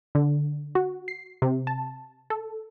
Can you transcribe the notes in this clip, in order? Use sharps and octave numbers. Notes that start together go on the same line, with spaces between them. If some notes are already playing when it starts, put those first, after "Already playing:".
D3
F#4
C7
C3
A5
A4